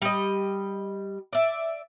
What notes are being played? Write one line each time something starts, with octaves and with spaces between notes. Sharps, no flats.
G3 D#5
D5 E5